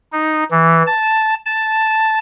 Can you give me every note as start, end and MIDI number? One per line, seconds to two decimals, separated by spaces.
0.13 0.44 63
0.51 0.83 52
0.86 1.34 81
1.46 2.19 81